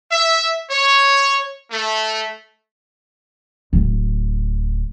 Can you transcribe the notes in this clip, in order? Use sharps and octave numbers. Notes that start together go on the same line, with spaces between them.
E5
C#5
A3
D1